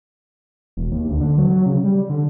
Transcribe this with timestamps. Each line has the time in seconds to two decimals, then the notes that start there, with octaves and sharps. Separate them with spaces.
0.77 E1
0.92 D#2
1.10 D2
1.21 D3
1.38 F#3
1.50 F#3
1.66 C#3
1.84 G3
2.10 D3